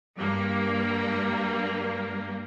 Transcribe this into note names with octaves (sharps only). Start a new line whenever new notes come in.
G2 A#3